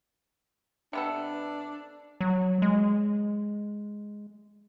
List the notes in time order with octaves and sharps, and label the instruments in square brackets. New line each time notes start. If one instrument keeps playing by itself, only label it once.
[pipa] C3 B3 A4 [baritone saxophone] D4
[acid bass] F#3
G#3